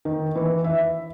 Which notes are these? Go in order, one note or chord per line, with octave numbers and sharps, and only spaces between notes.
D#3
E3
E5